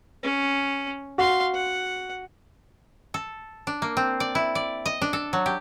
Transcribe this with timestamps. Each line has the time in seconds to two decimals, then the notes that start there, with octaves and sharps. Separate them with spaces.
0.23 C#4
1.18 F#4 F5 C6
1.54 F#5
3.14 A4
3.67 D4
3.82 A#3
3.97 C4
4.20 D5
4.35 E4
4.55 D5
4.86 D#5
5.02 D4
5.13 A4
5.33 F#3
5.46 G4